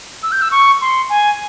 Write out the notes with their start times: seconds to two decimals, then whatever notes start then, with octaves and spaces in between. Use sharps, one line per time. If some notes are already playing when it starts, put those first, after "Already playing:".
0.23 E6
0.32 G6
0.42 E6
0.51 C#6
0.81 C6
1.10 G#5